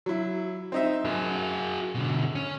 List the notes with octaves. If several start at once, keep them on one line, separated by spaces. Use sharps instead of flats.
F#3 E4
C4 D#4 E5
F#2 F#4 G#4
B2 D3
C#4